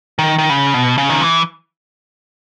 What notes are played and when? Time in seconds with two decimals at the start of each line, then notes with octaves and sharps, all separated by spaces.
0.19 D#3
0.38 D#3
0.50 C#3
0.74 B2
0.98 C#3
1.10 D#3
1.21 E3